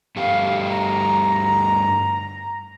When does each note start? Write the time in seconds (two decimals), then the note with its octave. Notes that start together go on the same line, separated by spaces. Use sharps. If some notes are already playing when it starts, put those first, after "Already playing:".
0.16 G2 A3 G4 F5
0.70 A#5